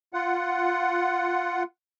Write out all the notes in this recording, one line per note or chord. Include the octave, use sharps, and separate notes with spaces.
F4 F#5